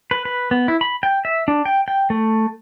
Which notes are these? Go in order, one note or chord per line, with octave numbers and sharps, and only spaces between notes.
B4
B4
B3
E4
B5
G5
E5
D4
G5
G5
A3